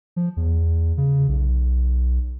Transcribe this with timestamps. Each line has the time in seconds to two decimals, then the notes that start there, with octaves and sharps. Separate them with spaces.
0.16 F3
0.37 E2
0.97 C#3
1.28 B1